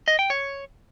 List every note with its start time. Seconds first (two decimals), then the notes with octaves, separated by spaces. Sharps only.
0.08 D#5
0.19 G5
0.30 C#5